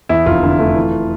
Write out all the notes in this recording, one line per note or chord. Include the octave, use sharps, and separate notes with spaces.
E2 E4
F1 F4
D3
A3
E3